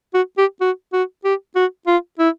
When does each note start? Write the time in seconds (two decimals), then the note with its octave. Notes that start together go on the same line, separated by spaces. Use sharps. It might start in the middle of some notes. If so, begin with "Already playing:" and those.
0.14 F#4
0.38 G4
0.61 F#4
0.93 F#4
1.24 G4
1.56 F#4
1.87 F4
2.19 E4